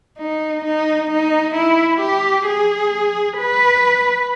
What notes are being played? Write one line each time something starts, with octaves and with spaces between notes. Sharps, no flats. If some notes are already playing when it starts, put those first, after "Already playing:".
D#4
D#4
D#4
E4
G4
G#4
B4